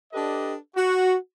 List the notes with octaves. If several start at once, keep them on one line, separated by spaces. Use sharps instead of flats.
D4 G4 A4 B4 D5 D#5
F#4